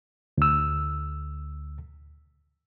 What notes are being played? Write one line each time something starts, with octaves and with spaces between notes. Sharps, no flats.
D2 E6